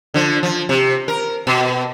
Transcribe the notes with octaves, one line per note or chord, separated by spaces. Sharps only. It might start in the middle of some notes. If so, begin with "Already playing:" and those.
D3 F3
F3
C3
A#4
B2